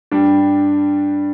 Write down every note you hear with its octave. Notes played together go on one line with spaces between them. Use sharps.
G2 G3 D4